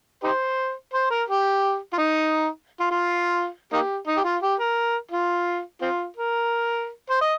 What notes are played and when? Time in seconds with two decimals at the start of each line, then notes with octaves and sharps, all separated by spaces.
0.24 D#4 G4 C5
0.94 C5
1.10 A#4
1.28 G4
1.93 F4
1.98 D#4
2.80 F4
2.91 F4
3.73 A#3 D#4 G4
4.07 D#4
4.17 G4
4.25 F4
4.43 G4
4.60 A#4
5.12 F4
5.81 C4 F4
6.17 A#4
7.10 C5
7.21 D#5